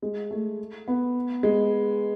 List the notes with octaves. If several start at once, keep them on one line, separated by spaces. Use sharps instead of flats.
G#3
A3
B3
G#3